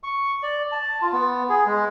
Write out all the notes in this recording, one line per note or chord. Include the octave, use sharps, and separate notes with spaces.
C#6
D5
A5
F4
B3
G#4
G#3